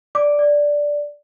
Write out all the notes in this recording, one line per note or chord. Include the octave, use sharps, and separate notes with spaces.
D5 D6
D5